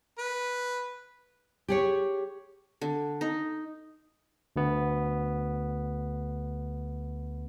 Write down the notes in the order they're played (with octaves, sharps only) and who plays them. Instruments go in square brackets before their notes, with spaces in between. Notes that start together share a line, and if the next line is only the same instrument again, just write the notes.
[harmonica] B4
[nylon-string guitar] G4 G#4 C#5
[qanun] D3
D#4
[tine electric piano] D2 B3